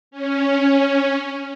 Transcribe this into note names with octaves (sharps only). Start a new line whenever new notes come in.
C#4